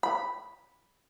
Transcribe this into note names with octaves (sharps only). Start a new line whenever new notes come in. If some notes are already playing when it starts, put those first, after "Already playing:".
B5